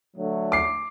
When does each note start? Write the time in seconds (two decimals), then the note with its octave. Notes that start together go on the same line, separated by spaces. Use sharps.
0.17 D3 F#3 A3
0.52 D6 C7